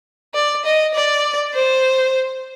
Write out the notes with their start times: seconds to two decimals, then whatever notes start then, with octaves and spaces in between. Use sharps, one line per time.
0.34 D5
0.65 D#5
0.94 D5
1.54 C5